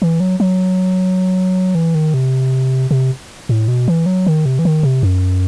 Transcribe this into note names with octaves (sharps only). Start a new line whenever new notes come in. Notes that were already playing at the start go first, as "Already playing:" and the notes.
E3
F#3
F#3
E3
D#3
C3
C3
A2
B2
E3
F#3
D#3
C3
E3
D#3
C3
F#2